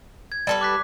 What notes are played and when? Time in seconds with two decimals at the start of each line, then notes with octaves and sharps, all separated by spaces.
0.32 G#6
0.47 G3 A4 B4
0.61 D6 F#6 B6